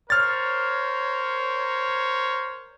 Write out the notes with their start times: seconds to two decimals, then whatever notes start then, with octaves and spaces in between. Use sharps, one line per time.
0.10 A#4 C5 C#5 F6 A6